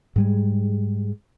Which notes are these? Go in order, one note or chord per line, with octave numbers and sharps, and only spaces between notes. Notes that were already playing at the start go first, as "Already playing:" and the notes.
G#2 G3 G#3